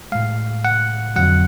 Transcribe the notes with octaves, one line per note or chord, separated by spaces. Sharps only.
A2 G#3 F5
F#5
F2 D3 F#3 F#5